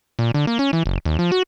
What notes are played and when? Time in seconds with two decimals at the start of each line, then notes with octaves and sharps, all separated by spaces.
0.19 A#2
0.34 D3
0.47 A#3
0.59 C#4
0.73 E3
0.86 F#1
1.05 D#2
1.19 F3
1.32 F#4